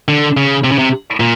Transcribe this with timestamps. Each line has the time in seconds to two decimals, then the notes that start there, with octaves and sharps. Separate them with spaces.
0.08 D3
0.37 C#3
0.64 C3
0.72 C#3
0.79 C3
1.20 A#2